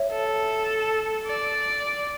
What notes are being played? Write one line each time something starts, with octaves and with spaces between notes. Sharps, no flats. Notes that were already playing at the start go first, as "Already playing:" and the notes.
Already playing: C#5 E5
A4
D5